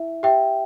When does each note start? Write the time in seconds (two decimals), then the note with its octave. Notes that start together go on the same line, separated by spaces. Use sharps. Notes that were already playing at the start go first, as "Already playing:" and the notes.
Already playing: E4 E5
0.23 G4 E5 G5